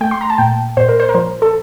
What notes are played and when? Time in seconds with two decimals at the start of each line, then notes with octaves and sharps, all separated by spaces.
0.01 A3 G5
0.11 C6
0.21 A#5
0.30 A5
0.38 A#2 G5
0.77 A#2 C5
0.89 A#4
1.00 C5
1.09 A#4
1.15 F3 C5
1.42 A4